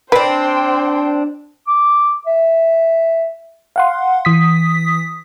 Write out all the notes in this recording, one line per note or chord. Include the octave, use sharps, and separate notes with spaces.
C4 D4 B4 C5 G5
D6
E5
F5 F#5 C6
E3 D#6 B6